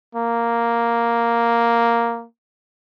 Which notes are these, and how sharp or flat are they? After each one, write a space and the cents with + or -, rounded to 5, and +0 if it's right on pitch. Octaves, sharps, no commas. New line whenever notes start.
A#3 +0